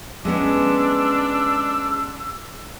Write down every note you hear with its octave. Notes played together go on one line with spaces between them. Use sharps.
G#3 B3 C#4 D4 E6